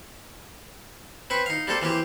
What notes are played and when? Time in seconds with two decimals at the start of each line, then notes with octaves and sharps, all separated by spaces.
1.30 C4 B4 B5 C#6
1.46 D#4 F5
1.68 G3 A#3 C4 A4
1.82 E3 A#3 C4 G4